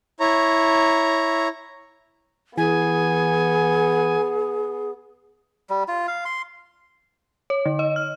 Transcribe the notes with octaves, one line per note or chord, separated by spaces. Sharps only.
E4 C#5 A#5
E3 B3 G#4 G#5
G3
F4
F5
C6
C#5
D3
D#5
F6